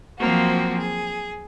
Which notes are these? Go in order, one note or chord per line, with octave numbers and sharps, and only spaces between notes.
F3 F#3 A#3 C4 F#4
G#4